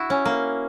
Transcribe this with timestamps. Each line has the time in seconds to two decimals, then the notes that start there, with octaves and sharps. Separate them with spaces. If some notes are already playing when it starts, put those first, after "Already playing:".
Already playing: E4 F#4
0.10 C#4
0.25 A#3